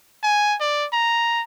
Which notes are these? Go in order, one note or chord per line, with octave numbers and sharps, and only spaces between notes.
G#5
D5
A#5